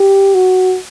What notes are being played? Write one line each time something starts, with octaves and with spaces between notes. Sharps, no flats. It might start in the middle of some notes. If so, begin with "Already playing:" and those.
Already playing: G4
F#4